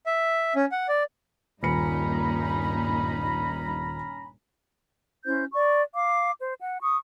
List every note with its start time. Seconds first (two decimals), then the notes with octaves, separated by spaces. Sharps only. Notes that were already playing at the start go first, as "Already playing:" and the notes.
0.06 E5
0.56 C#4
0.72 F#5
0.88 D5
1.63 D#1 G2 A#2 C#4 D#4 A#5 B5 C#7
5.25 C#4 E4 C5 G6
5.51 D5 C#6
5.94 F5 D6
6.40 C5
6.59 F#5
6.81 C#6 D#6